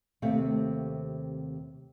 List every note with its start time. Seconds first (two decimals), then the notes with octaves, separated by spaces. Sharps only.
0.22 D#2 C3 A3 C4 F5